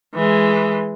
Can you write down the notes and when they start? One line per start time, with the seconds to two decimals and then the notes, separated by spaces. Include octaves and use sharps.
0.15 E3 G#3